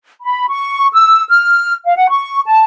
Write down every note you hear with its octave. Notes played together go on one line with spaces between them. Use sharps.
B5
C#6
E6
F6
F5
F#5
C#6
A5